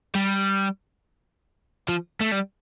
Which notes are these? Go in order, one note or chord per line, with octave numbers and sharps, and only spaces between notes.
G3
F3
A3
G3